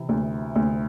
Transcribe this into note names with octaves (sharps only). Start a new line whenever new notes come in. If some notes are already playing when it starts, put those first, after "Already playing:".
Already playing: C3 E3
D2
D2